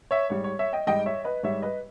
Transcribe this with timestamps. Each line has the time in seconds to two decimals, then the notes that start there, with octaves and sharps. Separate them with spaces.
0.11 C#5 E5
0.30 G#2 G3 C#5
0.44 C#5
0.59 C#5 E5
0.73 D#5 G5
0.87 G#2 G3 D#5 G5
1.06 C#5 E5
1.24 B4 D#5
1.43 G#2 G3 C#5 E5
1.62 B4 D#5